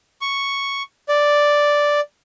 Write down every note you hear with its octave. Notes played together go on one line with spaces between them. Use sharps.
C#6
D5